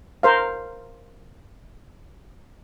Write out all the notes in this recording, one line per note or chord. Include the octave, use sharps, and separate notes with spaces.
A#4 C5 F5